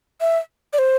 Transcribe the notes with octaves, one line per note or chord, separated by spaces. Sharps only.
E5
D5
C5